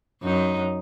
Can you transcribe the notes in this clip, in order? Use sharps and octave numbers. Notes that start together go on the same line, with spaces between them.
F#2 D#4